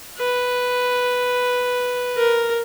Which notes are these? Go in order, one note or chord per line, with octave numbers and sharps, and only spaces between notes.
B4
A#4